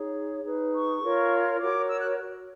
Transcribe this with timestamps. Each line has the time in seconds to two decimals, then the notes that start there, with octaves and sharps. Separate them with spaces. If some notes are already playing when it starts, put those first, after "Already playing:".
Already playing: D#4 G#4 C#5
0.44 D#4 G#4 B4
0.74 C#6
1.02 F4 A#4 C#5
1.60 F#4 A#4 C#5 D6
1.90 E6
1.99 F#6